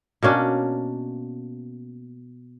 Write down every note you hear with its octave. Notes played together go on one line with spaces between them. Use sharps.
B2 A#3 C#4 D4